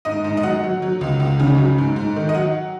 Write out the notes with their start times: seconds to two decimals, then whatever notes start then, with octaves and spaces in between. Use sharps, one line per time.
0.05 G#2 D#5
0.24 G#2
0.37 D#5
0.43 F#3 F#5
0.64 F#3
0.82 F#3
1.01 C#2
1.20 C#2
1.40 C#3
1.58 F#3
1.78 G#2
1.96 G#2
2.16 D#3
2.29 D#5
2.34 F#3 F#5